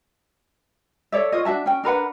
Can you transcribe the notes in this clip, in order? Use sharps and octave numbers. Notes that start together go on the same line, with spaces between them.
A4 C#5 D5 E5
F4 C#5 D#5
D4 F#4 E5 A5
C#4 G5
D4 A#4 B4 F#5